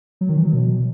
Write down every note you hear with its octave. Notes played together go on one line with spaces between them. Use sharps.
F#3
D#3
E3
F#3
B2